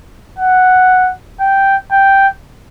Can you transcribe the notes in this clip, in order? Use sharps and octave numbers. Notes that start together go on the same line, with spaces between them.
F#5
G5
G5